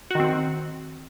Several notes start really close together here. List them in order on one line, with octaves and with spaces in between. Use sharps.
F#4 D#3 C4